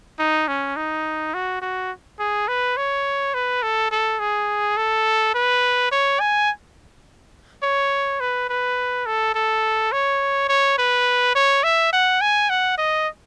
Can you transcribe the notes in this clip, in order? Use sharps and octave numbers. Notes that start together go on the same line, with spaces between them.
D#4
C#4
D#4
F#4
F#4
G#4
B4
C#5
B4
A4
A4
G#4
A4
B4
C#5
G#5
C#5
B4
B4
A4
A4
C#5
C#5
B4
C#5
E5
F#5
G#5
F#5
D#5